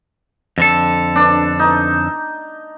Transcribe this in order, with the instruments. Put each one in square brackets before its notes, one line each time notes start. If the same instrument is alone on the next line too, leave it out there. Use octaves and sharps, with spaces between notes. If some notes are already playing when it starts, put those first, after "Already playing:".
[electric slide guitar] F2 D3 A4
[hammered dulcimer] D4
D#4